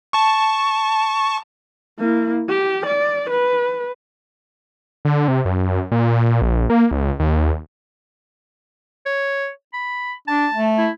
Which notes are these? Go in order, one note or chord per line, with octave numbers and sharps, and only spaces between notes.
A5 C#6
A#3 E4
G4
D5
B4
D3
C3
F#2
A#2
A#1
A#3
C#2
D#2
C#5
B5
D4 A5
A3
E4